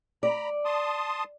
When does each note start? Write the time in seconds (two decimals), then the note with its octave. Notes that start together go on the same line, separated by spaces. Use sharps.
0.23 D5 A#5 B5
0.65 A5 C6 D#6